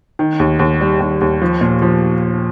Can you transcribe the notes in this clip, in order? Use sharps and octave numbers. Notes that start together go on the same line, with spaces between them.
D#3
D#2
D#2
G3
D#2
D#2
F3
A#2
F3